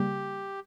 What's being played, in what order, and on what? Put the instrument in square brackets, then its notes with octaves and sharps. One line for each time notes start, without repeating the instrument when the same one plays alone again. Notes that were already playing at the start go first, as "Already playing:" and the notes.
Already playing: [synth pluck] C#3 G3 A#3 [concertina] G4